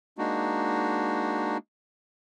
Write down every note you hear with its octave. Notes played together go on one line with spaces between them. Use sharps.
G#3 A#3 D4 D#4 F#4